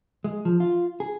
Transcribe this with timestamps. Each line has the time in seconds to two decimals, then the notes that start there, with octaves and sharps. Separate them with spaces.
0.24 G#3
0.45 F3
0.60 F4
1.00 G#4